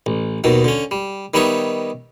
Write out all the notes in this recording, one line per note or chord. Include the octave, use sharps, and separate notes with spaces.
A1
D#2 B2 D#3 F#3
D3 C#4
G3
D#3 G3 B3 D#4 C#5 E5